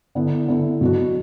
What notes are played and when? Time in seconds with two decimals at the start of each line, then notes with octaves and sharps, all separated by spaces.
0.15 D3 B3 E4
0.48 D3 B3 E4
0.81 B2 F#3 D4 F#4